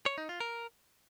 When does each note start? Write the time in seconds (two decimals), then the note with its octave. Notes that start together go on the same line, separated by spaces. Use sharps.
0.06 C#5
0.18 D#4
0.29 F4
0.40 A#4